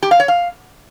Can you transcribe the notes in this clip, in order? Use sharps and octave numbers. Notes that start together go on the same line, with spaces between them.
G4
F5
C#5
F5